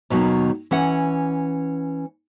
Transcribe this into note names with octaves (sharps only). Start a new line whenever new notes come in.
D#2 B2 D#3 F#3
E3 C#4 F#5